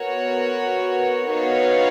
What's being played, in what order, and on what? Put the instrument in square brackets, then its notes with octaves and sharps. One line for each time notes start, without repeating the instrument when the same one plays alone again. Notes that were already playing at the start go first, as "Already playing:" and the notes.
Already playing: [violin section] B3 F#4 A#4 C#5
B3 D#4 F#4 C#5 F5